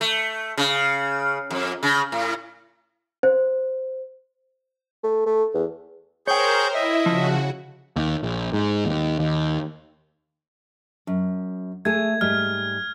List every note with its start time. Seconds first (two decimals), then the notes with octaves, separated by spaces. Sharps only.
0.01 A3
0.57 C#3
1.51 F2
1.83 C#3
2.12 A2
3.23 C5
5.04 A3
5.26 A3
5.54 E2
6.28 G#4 A#4 C5 C#5 G5 C#6 G6
6.74 E4 D#5 E5
7.06 C#3 F3 F#4
7.96 D#2
8.23 A#1
8.53 G#2
8.85 D#2
9.19 D#2
11.07 F#2
11.85 A3 G#4 G#6
12.21 G#2 G3 F6